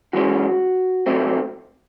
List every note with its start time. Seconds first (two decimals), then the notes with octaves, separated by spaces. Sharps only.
0.13 F#2 E3 G#3 C#4 F#4
1.06 C3 F#3 A3 C4